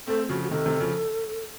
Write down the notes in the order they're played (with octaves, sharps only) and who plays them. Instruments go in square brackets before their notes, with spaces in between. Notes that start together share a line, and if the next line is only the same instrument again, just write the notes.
[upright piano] A3 C4 [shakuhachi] A4
[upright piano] C#3 F3 [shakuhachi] F#4
[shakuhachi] F#4
[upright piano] C3 D#3 [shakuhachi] A4
[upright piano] C3 D#3
C#3 F3